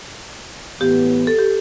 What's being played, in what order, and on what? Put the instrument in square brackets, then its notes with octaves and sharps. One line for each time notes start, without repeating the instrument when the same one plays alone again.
[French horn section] A2 E3 B3 [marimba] G4
[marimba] A4
G4